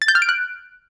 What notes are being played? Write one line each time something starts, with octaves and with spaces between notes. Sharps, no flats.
A6
G6
F6
D7
F#6